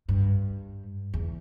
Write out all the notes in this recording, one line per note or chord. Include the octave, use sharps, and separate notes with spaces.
G2
E2